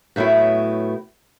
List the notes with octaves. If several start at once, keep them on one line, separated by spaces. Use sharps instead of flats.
A2 F#3 A3 B3 E4